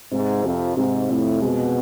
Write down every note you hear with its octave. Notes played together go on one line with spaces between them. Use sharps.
G#2 C3
F2 C3
G#2 C3
F2 A2
B2 G#3